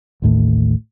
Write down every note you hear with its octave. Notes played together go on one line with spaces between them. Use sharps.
A1 D#2 A2